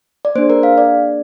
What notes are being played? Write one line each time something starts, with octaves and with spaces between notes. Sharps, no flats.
D5
A#3 D4 G#4 C5
A#4
F5
D5